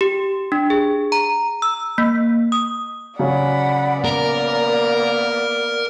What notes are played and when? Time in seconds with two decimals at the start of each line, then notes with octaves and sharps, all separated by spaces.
0.01 G4
0.52 D4
0.70 G#4
1.12 A#5
1.62 E6
1.98 A#3
2.52 D#6
3.19 C#3 F#3 C#4 D5 F#5 B5
4.05 A#3 B3 A#4